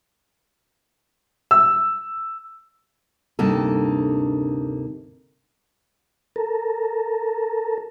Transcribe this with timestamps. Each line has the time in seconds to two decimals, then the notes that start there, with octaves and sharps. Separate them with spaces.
1.51 E6
3.39 D2 G2 C3 A#3 D#4 A4
6.36 A4 A#4